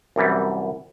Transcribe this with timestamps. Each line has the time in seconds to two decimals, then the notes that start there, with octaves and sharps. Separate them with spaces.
0.16 C2 F#2 E3 G3